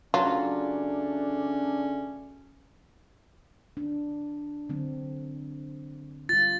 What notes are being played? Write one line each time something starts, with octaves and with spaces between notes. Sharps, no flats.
C#3 F#3 A3 C#4 D4 F4
D4
D3 F#3 C4
G3 F4 A6